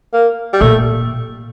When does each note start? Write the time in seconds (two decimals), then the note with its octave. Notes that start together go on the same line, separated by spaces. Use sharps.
0.13 A#3
0.53 G3
0.61 A#2 A3